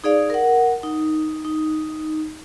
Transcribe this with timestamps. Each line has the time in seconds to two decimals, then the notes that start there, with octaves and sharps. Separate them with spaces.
0.04 D#4 G#4 D5 F5
0.30 A#4 F#5
0.83 D#4
1.45 D#4